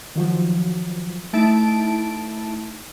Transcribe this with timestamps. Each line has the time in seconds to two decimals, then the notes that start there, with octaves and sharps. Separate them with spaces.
0.15 D#3 F3 F#3
1.33 A3 D#4 E4 A5 D7